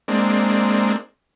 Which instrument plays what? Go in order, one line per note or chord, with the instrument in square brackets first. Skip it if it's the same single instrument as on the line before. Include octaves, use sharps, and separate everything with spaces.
[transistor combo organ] G#3 A#3 C4 D4